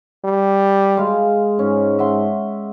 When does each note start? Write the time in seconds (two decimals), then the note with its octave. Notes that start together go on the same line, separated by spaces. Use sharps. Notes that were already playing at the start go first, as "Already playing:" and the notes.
0.24 G3
0.97 G#3 F5
1.59 G#2 C#4
1.99 E5 F#5 C6